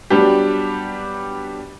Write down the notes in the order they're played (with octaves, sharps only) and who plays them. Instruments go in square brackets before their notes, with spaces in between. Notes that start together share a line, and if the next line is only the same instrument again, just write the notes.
[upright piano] F#3 G3 B3 D4 G4